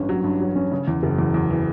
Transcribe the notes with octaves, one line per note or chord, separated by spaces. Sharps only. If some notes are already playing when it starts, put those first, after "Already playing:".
Already playing: A1 G2 C#4
F#3
G2
F#3
C#4
C#3
E2
F#1
E2
E2
E3